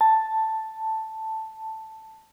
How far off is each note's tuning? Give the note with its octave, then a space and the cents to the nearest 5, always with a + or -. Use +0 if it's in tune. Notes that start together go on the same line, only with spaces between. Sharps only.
A5 +5